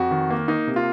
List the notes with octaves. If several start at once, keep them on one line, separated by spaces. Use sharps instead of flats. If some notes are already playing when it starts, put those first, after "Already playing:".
Already playing: F2 F#4
D#3
A#3
A#3 D#4
C3
F4